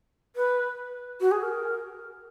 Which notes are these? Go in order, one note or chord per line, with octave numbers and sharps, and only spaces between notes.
B4
F#4
G#4
A#4